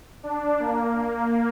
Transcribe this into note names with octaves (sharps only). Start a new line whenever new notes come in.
D4
A#3
A#3